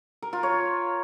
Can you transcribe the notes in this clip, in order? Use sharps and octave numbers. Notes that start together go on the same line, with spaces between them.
A#4
F4
C#5